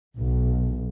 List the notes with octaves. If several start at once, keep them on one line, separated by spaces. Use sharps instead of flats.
B1